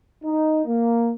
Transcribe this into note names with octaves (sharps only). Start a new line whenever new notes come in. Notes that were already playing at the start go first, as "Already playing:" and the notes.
D#4
A#3